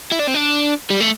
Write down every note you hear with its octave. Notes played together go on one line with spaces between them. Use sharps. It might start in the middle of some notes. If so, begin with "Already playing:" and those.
E4
D4
C4
D4
G3
A3